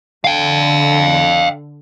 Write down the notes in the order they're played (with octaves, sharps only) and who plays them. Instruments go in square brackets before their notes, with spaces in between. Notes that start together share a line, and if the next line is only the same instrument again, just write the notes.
[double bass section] D3 [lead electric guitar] F5 G5